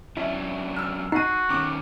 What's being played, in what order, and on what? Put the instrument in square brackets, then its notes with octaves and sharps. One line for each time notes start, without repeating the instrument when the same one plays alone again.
[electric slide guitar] F#3 C#4 D4 [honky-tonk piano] E4
[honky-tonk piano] E6 F6
[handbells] D#4 [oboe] F#4 [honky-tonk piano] C7 D#7
[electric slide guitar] G2 D#3 C#4 [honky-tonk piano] D6